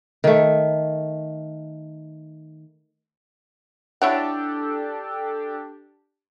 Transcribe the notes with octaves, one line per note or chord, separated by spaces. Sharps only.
D#3 A3
D4 E4 G4 A4 C#5 F#5